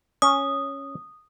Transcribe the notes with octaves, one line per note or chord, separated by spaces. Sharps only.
C#4 D#6